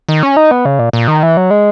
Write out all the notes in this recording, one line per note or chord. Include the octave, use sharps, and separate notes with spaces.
D#3
C#4
D#4
B3
C#3
A#2
A#2
D#3
E3
F#3
G#3